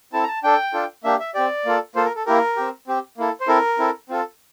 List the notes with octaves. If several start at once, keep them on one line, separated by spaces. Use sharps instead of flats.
C4 E4 A4 A5
A#5
A5
D4 A4 G5
D4 F4 A4
A#3 D4 G4 E5
E5
C4 G4 D5
A#3 F4 A4
A#3 F4 A4 C5
A#4
A4
A#3 E4 G4 A#4
C4 G4
C4 G4
A#3 E4 A4
C5
C4 E4 A4 A#4
C4 E4 A4
C4 F4 A4